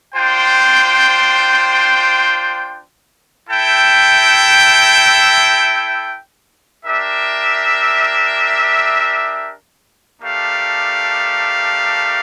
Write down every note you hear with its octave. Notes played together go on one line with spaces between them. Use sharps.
D4 F4 C5 G5
E4 A4 E5 G5
D4 G4 A#4 E5
A3 D4 G4 A#4 F5